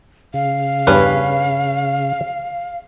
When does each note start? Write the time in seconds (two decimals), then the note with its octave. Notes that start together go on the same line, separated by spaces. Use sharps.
0.34 C#3 F5
0.87 E2 G2 C#4 B4